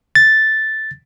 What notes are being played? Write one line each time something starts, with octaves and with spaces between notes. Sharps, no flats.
A6